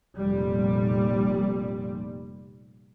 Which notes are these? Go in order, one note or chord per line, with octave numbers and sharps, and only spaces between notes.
F1 A#2 G3